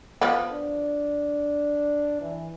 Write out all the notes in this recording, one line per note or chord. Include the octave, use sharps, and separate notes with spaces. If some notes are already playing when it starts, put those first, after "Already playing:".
F3 B3
D4
E3